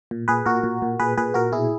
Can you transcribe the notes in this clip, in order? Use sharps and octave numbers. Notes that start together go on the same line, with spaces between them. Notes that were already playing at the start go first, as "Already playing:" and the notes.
A#2
A#2 G#4 B4
A#2 F#4 A#4
A#2
A#2
A#2 G#4 B4
A#2 G#4 B4
A#2 F#4 A#4
B2 E4 G#4